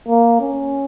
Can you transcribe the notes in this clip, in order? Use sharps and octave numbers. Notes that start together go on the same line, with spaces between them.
A#3
C#4